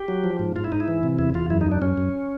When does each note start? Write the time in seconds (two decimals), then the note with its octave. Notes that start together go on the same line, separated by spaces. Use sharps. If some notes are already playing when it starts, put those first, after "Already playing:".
Already playing: G4
0.08 F#3
0.24 F3
0.39 G#2
0.56 G#2 F4
0.64 E4
0.72 G#2 D#4
0.80 E4
0.88 E3
1.03 C3
1.19 E2 E4
1.34 E2 F4
1.50 F#2 E4
1.61 D#4
1.66 F#2
1.72 D4
1.82 F#2 C#4
1.98 F#2